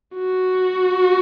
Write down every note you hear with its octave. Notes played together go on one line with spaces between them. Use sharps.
F#4